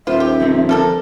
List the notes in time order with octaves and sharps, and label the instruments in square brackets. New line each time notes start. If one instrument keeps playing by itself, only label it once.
[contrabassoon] D#1 [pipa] F4 C5 [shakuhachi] E5
[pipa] G4
[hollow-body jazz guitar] F2 D3 C4
[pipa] G3 A4 A#4